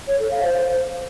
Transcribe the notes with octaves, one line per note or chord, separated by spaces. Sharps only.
C#5
A4
F5
C5